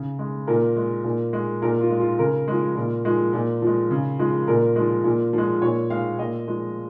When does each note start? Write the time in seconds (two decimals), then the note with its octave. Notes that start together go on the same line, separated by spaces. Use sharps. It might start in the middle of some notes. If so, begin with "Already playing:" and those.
Already playing: C#3
0.19 G#3
0.47 A#2 A#4
0.77 G#3
1.05 A#2
1.33 G#3
1.62 A#2 A#4
1.81 F4
1.90 G#3
2.00 F4
2.19 C#3 A#4
2.48 F3 G#3
2.76 A#2
3.05 F3 G#3
3.33 A#2
3.62 F3 G#3
3.91 C#3
4.19 F3 G#3
4.48 A#2 A#4
4.76 F3 G#3
5.04 A#2
5.33 F3 G#3
5.62 A#2 C#5
5.90 G#3 F5
6.19 A#2 D#5
6.48 F3 G#3